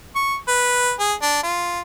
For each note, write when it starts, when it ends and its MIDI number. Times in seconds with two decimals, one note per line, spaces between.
0.16 0.35 85
0.48 0.92 71
1.00 1.13 68
1.22 1.42 62
1.43 1.80 65